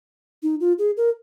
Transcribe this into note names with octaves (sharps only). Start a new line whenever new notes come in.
D#4
F4
G#4
A#4